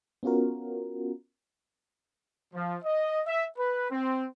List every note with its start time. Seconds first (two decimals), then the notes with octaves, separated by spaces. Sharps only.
0.23 B3 C#4 F4 F#4 A#4
2.54 F3
2.84 D#5
3.27 E5
3.58 B4
3.91 C4